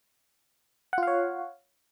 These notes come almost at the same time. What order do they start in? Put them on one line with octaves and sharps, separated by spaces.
F#5 F4 F5 C#5